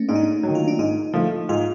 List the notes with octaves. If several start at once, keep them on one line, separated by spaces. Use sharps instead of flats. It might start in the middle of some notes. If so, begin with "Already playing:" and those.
Already playing: A3 A#3 C#4
G#2 D4
D#4
D4
D#3 F#3
F4
D4
G#2 D#4
F3 A3
G#2 F4